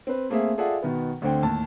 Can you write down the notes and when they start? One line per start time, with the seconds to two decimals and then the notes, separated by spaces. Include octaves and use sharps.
0.07 C4 B4
0.30 A3 A#3 C4 G#4 E5
0.58 F4 G#4 A4 D5 E5 F#5
0.82 B2 D#3 B3
1.22 D2 D3 C4 G5
1.43 D#2 A2 A5